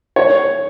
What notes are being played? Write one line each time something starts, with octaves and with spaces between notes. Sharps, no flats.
C#5